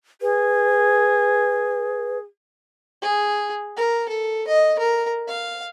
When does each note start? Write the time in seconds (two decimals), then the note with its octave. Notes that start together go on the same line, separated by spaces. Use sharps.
0.21 G#4 B4
3.02 G#4
3.76 A#4
4.09 A4
4.47 D#5
4.79 A#4
5.27 F5